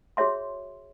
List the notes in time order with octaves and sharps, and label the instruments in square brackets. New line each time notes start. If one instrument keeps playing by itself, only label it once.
[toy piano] F#4 G#4 C#5 E5 C6